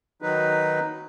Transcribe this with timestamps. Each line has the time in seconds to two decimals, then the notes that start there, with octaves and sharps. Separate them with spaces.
0.22 D#3 F#3 D#4 B4